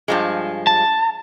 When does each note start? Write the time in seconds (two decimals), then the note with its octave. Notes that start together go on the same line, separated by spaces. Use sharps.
0.08 G2 F3 G#3
0.67 A5